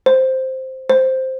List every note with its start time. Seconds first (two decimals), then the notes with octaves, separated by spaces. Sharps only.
0.06 C5
0.90 C5